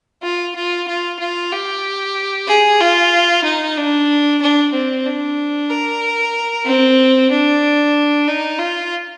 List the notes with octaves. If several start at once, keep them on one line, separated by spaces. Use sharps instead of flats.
F4
F4
F4
F4
G4
G#4
F4
D#4
D4
D4
C4
D4
A#4
C4
D4
D#4
F4